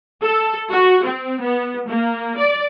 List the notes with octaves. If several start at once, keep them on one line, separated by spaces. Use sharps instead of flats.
A4
F#4
C4
B3
A#3
D5